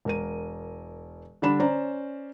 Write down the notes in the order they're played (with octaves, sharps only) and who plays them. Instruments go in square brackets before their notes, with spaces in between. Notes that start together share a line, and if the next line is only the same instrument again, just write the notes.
[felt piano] E1 A#4 D#7
D3 G3 D4 B5 E7
C#4 C5 D5 A#5